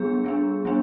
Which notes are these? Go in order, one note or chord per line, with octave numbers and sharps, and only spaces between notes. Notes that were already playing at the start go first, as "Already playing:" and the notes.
Already playing: G3 B3 D4 G#4
G3 B3 D4
G3 B3 D4